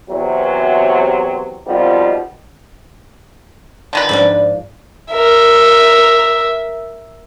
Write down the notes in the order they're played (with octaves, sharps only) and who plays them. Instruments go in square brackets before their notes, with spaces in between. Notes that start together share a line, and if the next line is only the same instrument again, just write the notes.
[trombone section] E2 C3 F#3
G#1 F2 B2 G3 D#4 F4
[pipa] D3 D#3 B4
[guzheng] G#2 F3 D4
[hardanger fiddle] A#4 E5